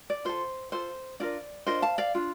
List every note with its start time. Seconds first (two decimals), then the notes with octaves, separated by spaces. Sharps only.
0.10 D5
0.25 F4 A4 C5
0.72 F4 A4 C5
1.20 D4 F4 A#4 D5
1.67 D4 F4 A#4 C5 D#5
1.82 F5 A5
1.98 D5 F5
2.15 D4 F4